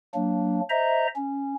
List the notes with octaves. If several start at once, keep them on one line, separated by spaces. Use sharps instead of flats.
F#3 A#3 D4
C5 D#5 E5 A#5
C#4